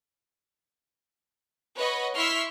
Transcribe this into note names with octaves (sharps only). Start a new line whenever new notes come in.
B4 C#5 D#5 F#5 B5 C#6
E4 C6 C#6 E6 F6 B6